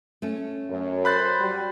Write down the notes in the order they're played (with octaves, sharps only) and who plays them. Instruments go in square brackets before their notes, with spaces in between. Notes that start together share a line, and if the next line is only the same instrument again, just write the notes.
[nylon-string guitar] A3 C#4
[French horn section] F#2
[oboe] C5 [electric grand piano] B5 F#6 A6
[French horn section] G3 F#4